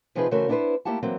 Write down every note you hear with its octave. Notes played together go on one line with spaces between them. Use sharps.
C3 F3 C4 D#4 G#4 B4
C#3 E3 A3 F#4 A#4 C5
B3 D4 E4 F4 B4 C5
A3 A#3 E4 G4 F#5 A5
E3 F#3 A#3 C4